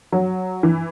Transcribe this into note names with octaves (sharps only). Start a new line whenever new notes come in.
F#3
E3